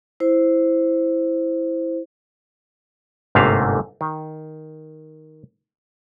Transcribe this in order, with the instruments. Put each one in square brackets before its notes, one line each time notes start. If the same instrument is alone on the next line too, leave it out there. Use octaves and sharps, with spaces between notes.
[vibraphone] E4 C5
[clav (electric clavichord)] G1 G#2 C3 A3 A#3 F5
D#3